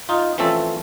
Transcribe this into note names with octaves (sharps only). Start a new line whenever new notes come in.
D#4 F4
E3 F3 A3 C4 C#4 A4